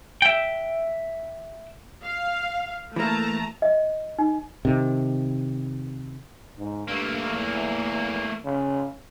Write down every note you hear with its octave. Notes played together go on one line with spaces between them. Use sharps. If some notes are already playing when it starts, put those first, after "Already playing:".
E5 G5
F5
E3 A3 A#3 A5 A#5
D#5
D#4
C3 D#3
G#2
G2 A3 A#3
E2
C#3